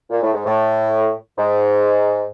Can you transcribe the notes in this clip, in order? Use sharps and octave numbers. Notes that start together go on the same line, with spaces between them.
A#2
A2
G#2
A2
G#2